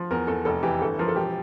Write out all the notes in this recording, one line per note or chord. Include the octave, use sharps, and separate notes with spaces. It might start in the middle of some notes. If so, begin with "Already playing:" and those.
Already playing: F3
E2 A#4
E2 A4
F1 A4
E3 G4
G1 A4
F3 A#4
A4
E1 G4